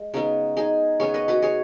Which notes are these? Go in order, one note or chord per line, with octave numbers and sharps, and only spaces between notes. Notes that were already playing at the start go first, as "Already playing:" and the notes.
Already playing: G#3
C#3 B3 D#4
D#4 G#4
C#3 B3 G#4 C#5
B4 D#5
F#4 B4
G#4 C#5